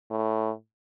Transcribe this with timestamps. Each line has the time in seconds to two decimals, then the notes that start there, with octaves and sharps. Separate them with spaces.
0.11 A2